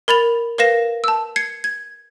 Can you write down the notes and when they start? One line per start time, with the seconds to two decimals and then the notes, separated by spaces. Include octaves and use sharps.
0.08 A#4 B5 A6 F7
0.58 A#4 B4 F5 A#6 E7
1.04 A5 E6
1.36 G#6 C7 C#7
1.64 G#6